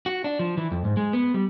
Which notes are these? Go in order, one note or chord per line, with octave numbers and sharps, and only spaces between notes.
F#4
D4
F3
E3
F2
G#2
G#3
B3
G3